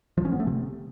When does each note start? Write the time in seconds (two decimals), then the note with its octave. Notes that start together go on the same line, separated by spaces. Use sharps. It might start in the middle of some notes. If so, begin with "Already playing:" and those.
0.18 F3
0.25 C#4
0.32 B3
0.40 A3
0.47 C3